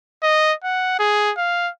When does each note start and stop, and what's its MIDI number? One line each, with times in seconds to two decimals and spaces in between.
0.23 0.53 75
0.64 0.96 78
0.99 1.32 68
1.38 1.70 77